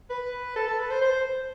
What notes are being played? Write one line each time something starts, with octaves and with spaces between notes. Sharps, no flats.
B4
A4
A4
B4
C5
C5